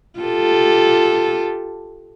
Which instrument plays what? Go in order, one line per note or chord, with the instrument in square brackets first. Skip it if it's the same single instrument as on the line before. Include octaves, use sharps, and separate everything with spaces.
[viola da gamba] F4 G4 A4